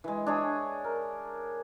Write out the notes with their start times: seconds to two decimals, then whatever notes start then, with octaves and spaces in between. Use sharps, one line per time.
0.04 E3 G#3
0.27 D4 G#4 C#5
0.84 A#4